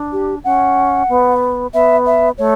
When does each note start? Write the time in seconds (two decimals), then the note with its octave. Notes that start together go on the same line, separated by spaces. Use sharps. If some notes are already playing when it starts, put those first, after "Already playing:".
Already playing: D4
0.12 G4
0.44 C#4 F#5
1.09 B3
1.73 B3 E5
2.06 E5
2.38 A3 C#5